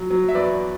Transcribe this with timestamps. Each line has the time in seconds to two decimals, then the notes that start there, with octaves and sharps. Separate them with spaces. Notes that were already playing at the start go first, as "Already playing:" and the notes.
Already playing: F#3
0.10 F#3
0.28 E5
0.35 E2 B4 D5